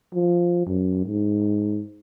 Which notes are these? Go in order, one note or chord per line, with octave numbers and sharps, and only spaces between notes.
F3
F#2
G#2